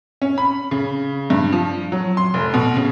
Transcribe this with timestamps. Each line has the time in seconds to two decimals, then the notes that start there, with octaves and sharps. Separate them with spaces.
0.22 C#4
0.38 B5
0.71 C#3
1.30 G2
1.52 F3
1.92 F#3
2.17 C6
2.34 F1
2.54 B2
2.76 C#3